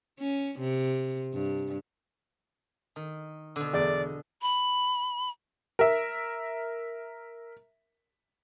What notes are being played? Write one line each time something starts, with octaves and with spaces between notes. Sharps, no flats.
C#4
C3
G2
D#3
B2 D3
E2 D5
B5
A#4 E5